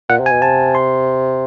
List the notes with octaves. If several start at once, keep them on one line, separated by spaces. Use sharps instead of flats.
A#2 F#5
C3
G#5
B2
C3 A5
C6